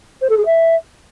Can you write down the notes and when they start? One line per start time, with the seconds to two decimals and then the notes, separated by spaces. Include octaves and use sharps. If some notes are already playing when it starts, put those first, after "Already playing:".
0.21 C5
0.29 A4
0.37 G#4
0.45 E5